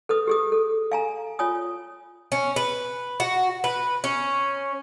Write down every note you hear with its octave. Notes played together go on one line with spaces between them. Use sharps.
A4 B4 D#6
G4 G#4 D#6
A4
F5 G#5 A#5
F4 C#5 G#5 D#6
C#4
B4
F#4
B4
C#4